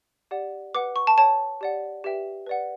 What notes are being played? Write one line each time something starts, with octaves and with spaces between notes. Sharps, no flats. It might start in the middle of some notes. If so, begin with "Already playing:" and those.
G4 D5 F#5
B4 F#5 D6
C#6
A5
C#5 G5 A5
G4 D5 F#5
G4 B4 E5 G5
B4 D5 F#5